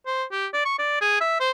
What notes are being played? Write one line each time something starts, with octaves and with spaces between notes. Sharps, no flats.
C5
G4
D5
C#6
D5
G#4
E5
C5